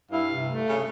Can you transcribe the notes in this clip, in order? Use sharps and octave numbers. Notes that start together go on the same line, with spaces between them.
G2 E4 F5
C3
A3
C#3